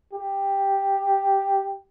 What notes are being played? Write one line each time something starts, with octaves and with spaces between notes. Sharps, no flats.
G4